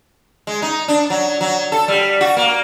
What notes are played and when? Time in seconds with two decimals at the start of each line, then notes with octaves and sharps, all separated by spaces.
0.47 G#3
0.62 D#4
0.88 D4
1.10 F#3
1.41 F#3
1.72 A4
1.88 G3
2.21 F#4
2.37 A#3